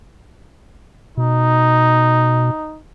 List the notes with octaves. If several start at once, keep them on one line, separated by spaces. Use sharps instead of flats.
B2 D#4